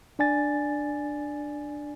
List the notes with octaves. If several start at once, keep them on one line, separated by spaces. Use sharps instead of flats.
D4 D5 G#5 A6